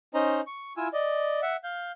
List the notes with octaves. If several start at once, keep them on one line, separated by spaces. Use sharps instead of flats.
C#4 D#4 C5 D#5 A#5
C#6
E4 F4 G#5 E6
D5 D#5
E5 F#5
F5 G6